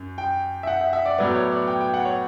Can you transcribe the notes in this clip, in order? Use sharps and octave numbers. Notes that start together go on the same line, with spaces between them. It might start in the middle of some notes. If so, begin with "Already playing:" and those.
Already playing: F#2
G5
E5
F#5
E5
E5
D5
A2 F#3 B3 D5
C#5
D5
G5
G5
F#5
C#5